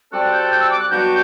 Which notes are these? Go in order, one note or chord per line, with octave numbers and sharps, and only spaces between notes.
G3 C4 F#4 A4 D5 F#6
G6
G6
E6
D6
F#6
G2 F#3 B3 D4 F#4 G6